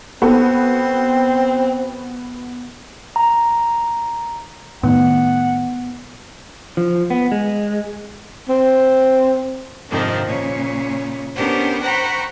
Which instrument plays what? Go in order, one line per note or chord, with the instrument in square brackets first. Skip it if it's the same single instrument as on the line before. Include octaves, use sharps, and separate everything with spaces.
[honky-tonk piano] B3 F#4 A4 [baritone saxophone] C4
[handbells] A#5
[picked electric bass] A2 D#3 [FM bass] B3 [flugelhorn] F#5
[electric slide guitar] F3
B3
G#3
[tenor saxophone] C4
[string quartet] F2 G#2 C3 D#3 F3 D4
A#2 C#3 C#4
B3 C#4 D4 G4 A#4 C5
C5 F#5 G5 A#5 B5 C#6